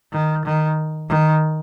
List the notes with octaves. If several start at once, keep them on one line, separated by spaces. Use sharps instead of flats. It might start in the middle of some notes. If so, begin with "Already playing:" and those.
D#3
D#3
D#3